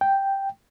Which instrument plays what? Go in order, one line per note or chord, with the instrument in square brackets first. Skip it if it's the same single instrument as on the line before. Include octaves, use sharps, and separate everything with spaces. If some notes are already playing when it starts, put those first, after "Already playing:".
[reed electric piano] G5